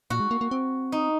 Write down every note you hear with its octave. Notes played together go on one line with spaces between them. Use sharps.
A#2 F#4
G#3
A#3
A#3
C4
D#4